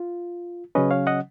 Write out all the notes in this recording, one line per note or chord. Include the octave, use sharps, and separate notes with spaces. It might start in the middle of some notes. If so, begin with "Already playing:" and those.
Already playing: F4
C#3 F#3 C#4 B4 D#5
C#5 F5
D#5 F#5